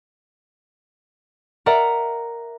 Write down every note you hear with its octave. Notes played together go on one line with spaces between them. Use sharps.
A#4 D5 E5 F#5 A#5